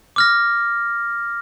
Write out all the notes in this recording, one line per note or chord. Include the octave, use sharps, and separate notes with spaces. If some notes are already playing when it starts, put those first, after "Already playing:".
D6 F6 A#6